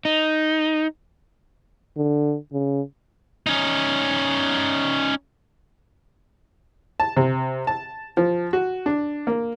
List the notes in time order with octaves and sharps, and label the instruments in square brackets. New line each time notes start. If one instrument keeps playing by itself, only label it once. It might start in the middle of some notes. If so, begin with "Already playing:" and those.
[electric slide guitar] D#4
[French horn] D3
C#3
[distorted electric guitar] C#4 D#4
[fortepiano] A5
C3
A5
F3
F#4
D4
A#3